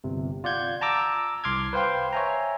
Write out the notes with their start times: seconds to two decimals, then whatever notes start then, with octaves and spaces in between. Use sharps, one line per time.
0.04 G1 C3
0.44 F4 D5 F#5 G6 G#6
0.81 A5 A#5 D6 E6
1.44 C2 C6 D6 F6 G#6
1.73 B4 C5 F5 G5 C6
2.13 C#5 E5 G#5 A#5